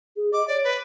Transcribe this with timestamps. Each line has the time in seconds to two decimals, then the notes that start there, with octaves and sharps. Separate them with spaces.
0.16 G#4
0.33 D#5 D6
0.48 C#5 D5
0.64 B4